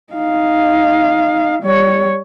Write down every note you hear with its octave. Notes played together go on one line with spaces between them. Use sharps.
D#4 F5
G3 C#5